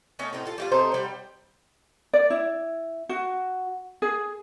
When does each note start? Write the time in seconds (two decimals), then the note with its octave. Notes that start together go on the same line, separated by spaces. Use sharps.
0.19 A3 C#4 D#4
0.33 A2 C4 D#4
0.45 F4 A4
0.58 G3 A3 F4
0.72 A3 C4 D#4 C5
0.92 G3 G5
2.14 D5
2.30 E4
3.09 F#4
4.02 G#4